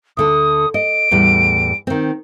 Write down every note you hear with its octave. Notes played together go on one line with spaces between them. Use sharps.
D2 D3 A4 D#6
D#5 D7
E2 A2 G3
D#3 C4